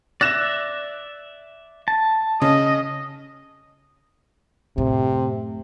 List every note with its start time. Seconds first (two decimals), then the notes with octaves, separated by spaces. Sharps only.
0.21 D5 E5 F#6 A#6 E7
1.88 A5
2.42 C#3 D#5
4.77 F#2 A2 C3